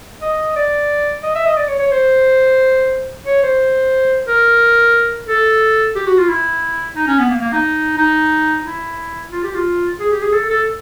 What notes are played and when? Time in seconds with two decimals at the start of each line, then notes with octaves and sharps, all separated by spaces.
0.22 D#5
0.56 D5
1.23 D#5
1.35 E5
1.45 D#5
1.57 D5
1.68 C#5
1.79 C#5
1.91 C5
3.26 C#5
3.43 C5
4.26 A#4
5.27 A4
5.96 G4
6.06 F#4
6.18 F4
6.29 E4
6.96 D#4
7.07 C#4
7.19 B3
7.30 A#3
7.41 A#3
7.52 D#4
7.97 D#4
8.65 E4
9.32 F4
9.44 G4
9.55 F4
10.00 G#4
10.11 G4
10.22 G#4
10.33 A4
10.50 A4